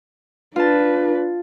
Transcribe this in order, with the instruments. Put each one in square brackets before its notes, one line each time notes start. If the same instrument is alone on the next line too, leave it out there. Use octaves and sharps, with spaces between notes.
[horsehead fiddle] D4 B4 [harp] F4 A5